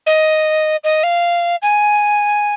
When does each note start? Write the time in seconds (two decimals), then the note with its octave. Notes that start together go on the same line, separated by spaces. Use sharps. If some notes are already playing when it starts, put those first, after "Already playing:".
0.06 D#5
0.84 D#5
1.03 F5
1.62 G#5